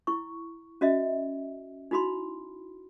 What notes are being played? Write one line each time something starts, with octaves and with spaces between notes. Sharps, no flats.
E4 C#6
C#4 F#4 D#5 E5
D#4 E4 F#4 B5 C6